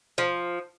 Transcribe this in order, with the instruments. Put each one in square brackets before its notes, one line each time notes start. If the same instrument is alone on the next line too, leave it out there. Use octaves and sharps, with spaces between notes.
[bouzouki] F3